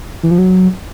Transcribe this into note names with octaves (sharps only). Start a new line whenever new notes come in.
E3
F3
F#3